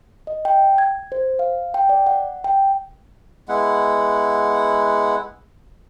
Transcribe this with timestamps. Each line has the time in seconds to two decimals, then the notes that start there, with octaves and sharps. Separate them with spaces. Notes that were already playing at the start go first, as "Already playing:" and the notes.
0.27 D#5
0.45 G5
0.78 G#6
1.12 C5
1.39 F5
1.74 G5
1.89 D5
2.07 F#5
2.44 G5
3.49 G#3 B3 E4 F#5